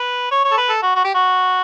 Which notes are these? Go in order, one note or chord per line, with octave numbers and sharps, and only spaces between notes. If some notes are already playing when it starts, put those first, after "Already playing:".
Already playing: B4
C#5
C#5
A4
B4
A4
F#4
F#4
G4
F#4